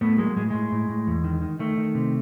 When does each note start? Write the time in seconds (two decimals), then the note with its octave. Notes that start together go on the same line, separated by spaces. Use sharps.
0.01 A2 A3 B3
0.18 F#3 G#3 A#3
0.37 A2 G#3
0.50 A2 G#3
0.72 A2
0.89 A2
1.07 E2
1.24 D#3
1.42 D#3
1.59 D#3 A3
1.77 D#3
1.95 C3